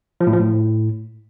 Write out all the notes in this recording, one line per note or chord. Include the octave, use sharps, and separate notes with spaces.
F3
A2
F3
A2